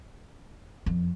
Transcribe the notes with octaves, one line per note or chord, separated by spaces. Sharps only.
F2